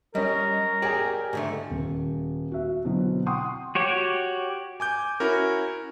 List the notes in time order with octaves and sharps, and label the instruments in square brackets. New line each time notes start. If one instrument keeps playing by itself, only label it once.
[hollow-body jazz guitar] G3 [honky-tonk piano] C#4 D#5 [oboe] A#4
[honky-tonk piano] G4 G#5 [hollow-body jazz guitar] G#4 C#5 D5
[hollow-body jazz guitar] G#2 D3 A3
[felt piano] D#1
F#4 E5
B2 D3 E3 F#3 C4
F#5 G5 C6 C#6 D#6
[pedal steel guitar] F#4 G4 C#5
[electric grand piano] G#5 D6 G6
C#4 E4 F#4 A#4